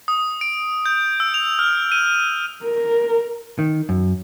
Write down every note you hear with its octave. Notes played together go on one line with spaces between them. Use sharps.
D#6
D7
G6
E6
F7
F6
D#7
A#4
D#3
F#2